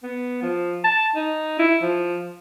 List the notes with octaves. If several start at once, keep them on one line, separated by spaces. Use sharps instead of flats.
B3
F3
A5
D#4
E4
F3